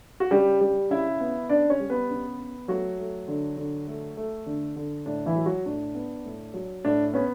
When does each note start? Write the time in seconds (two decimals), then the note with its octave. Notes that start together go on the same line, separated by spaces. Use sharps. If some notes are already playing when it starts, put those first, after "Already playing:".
0.20 F#4
0.31 C#3 G3 G4
0.61 G3
0.90 C#3 E4 E5
1.20 B3
1.49 C#3 D4 D5
1.70 C#4 C#5
1.80 G3
1.90 B3 B4
2.10 C#3
2.39 B3
2.68 F#3 A3 F#4
2.99 A3
3.28 D3
3.57 D3
3.87 A3
4.17 A3
4.46 D3
4.76 D3
5.06 A2 D4
5.26 E3 E4
5.35 F#3
5.46 F#3 F#4
5.65 A2 D4
5.95 B3
6.25 A2
6.54 F#3
6.84 A2 D4
7.14 B3 C#4